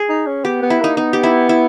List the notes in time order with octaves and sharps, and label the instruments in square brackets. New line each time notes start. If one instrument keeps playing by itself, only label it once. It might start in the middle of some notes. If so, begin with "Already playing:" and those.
Already playing: [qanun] G#4
[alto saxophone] D#4
C#4
[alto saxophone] B3 [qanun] G4
[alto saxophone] B3
[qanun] E4
[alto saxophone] A#3 [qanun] D#4
[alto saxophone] B3 [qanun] D#4
[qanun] G4
E4
E4